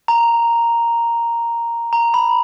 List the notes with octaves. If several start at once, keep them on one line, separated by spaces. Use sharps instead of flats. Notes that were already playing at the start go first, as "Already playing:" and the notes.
A#5
A#5
B5